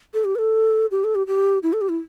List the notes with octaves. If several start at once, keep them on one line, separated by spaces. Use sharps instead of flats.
A4
G4
B4
A4
G4
A4
G4
G4
E4
A4
G4
E4